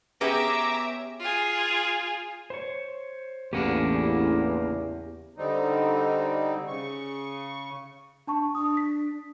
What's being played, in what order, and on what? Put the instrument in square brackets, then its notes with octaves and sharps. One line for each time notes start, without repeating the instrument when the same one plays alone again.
[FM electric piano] B3 [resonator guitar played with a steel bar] C#4 G4 G#4 [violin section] E5 [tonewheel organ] A#5 D6
[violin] F4 G#4
[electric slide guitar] C5 C#5
[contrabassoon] A1 [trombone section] E2 [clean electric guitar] C#3 A#3 D4 [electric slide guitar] G4 B4 F#5
[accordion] D3 G3 C4 D#4
C#3 C#6
[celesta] D4 A5 C#6
[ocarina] D4 [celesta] D#6
[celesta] B6